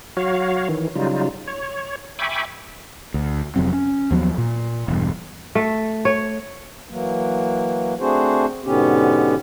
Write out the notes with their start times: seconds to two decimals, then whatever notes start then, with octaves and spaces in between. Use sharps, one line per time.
0.17 F#3 F#4 C#5 F5
0.69 D#3 E3
0.95 C#3 F#3 G3 D#4 F4
1.47 C#5
2.19 E5 G5 G#5 B5 C#6 D6
3.14 D2
3.56 F1 F2 F#3 C4
3.73 C#4
4.11 D#2 F3 F#3 B3
4.38 A#2
4.88 E1 G2
5.55 A3
6.05 C#5
6.89 E3 F#3 A#3
7.99 A3 C4 D4 F#4 G#4 C5
8.64 G#2 B2 D3 B3 C#4 G4